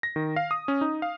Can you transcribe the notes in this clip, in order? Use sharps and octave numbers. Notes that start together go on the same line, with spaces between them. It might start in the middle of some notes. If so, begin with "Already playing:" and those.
A#6
D#3
F5
D#6
C#4
D#4
F5